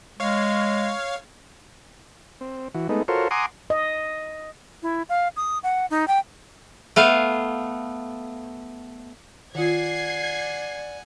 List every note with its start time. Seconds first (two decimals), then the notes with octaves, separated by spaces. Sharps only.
0.20 G#3 C#5 F5
2.41 C4
2.74 E3 F#4
2.89 G#3 A3 B3 D#4
3.08 F4 F#4 A4 A#4 C5 C#5
3.31 F#5 G#5 A#5 C6 D6 D#6
3.70 D#5
4.83 E4
5.09 F5
5.36 D#6
5.63 F#5
5.90 D#4
6.08 G5
6.96 A3 B3 F5
9.55 D#3 F4 D5 F#5 G#5 G#6 C7